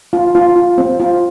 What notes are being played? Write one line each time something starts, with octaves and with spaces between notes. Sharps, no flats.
F4
F4
F4
C4
F4